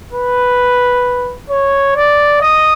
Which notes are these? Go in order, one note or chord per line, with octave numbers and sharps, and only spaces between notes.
B4
C#5
D5
D#5